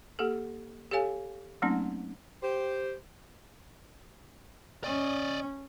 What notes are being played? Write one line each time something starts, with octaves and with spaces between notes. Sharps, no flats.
A#3 G4 A4
G4 A4 C#5 F5 G#5
F#3 A3 A#3 C4 C#4 D#4
G4 C5
C#4 D5 D#5